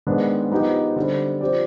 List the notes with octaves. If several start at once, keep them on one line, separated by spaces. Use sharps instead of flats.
G#2 D#3 B3 D4
F3 B3 D#4 G4
D3 G3 C4
F3 C4 G4 D5